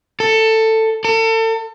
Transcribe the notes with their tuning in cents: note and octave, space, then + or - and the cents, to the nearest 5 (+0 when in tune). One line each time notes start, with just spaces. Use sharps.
A4 +15
A4 +35